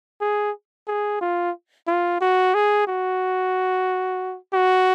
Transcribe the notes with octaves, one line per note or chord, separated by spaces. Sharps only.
G#4
G#4
F4
F4
F#4
G#4
F#4
F#4